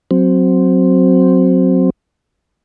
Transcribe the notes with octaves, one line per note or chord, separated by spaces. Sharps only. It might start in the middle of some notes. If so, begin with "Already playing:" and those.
F#3 C4